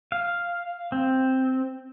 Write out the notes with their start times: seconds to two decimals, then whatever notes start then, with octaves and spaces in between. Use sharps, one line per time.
0.12 F5
0.92 C4